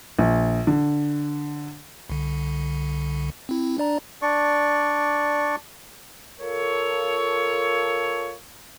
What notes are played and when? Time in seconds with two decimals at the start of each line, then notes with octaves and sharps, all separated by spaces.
0.19 A#1
0.67 D3
2.10 C2 D3
3.49 C4 E4
3.78 D4 D5 A#5
4.22 D4 D5 C#6
6.40 F4 A4 A#4 C#5